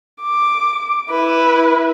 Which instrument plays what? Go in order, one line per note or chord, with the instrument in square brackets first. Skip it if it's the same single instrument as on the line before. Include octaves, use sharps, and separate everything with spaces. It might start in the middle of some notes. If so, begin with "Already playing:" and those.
[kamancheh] D6
E4 B4